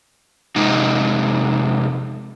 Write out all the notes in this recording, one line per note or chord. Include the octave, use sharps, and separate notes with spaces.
F2 C3 G#3 D#4